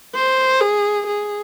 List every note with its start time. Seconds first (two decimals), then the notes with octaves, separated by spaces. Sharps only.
0.15 C5
0.61 G#4
1.07 G#4